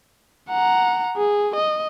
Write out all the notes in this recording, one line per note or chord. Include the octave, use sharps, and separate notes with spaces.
F#5 A#5
G#4
D#5